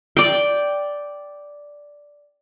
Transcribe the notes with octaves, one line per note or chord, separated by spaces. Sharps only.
D5 G5